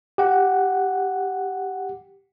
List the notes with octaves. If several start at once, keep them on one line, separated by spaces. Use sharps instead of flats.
G4 F#5